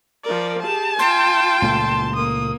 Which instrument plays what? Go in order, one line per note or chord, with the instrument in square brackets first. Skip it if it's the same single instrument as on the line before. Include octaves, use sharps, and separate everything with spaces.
[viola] F3 A#4 [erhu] D5
[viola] G4 G#4 [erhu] A5
[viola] F4 G5 [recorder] C6
[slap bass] C#2 A#2 A3 [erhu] A5
[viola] A#3 [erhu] D#6